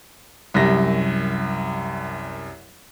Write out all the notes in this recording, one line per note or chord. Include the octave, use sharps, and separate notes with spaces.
C2 F#2 G3 A#6